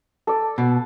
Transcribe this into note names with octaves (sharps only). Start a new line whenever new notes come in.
A4 D5
B2